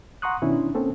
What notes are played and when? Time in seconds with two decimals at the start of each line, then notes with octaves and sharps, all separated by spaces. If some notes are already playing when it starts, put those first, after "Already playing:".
0.22 F#5 A#5 C6 C#6 D#6 F#6
0.42 B2 D#3 C#4 D4 E4
0.75 A#3 C4 C#4 A4